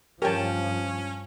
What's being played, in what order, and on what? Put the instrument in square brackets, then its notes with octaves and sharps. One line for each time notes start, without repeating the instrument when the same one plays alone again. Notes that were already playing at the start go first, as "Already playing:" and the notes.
[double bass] G2 F3 [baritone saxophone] C#4 [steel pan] G4 G5 A5 [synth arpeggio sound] A#4 C#5